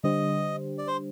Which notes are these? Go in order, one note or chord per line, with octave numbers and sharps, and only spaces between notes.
D3 G3 D4 G4 C5 D#5
D5
C5